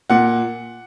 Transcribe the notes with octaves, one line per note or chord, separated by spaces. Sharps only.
A#2 F#5